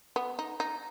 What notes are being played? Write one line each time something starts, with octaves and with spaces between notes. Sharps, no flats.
B3
D#4
D#4